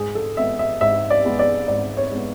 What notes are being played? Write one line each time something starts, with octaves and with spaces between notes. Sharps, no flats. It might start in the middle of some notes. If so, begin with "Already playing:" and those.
Already playing: G#2 G#4
A4
G#3 B3 E5
E5
G#2 E5
D5
G#3 B3
D5
G#2 D5
C#5
G#3 B3